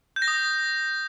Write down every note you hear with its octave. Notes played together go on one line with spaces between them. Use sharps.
G6
A#6
D#6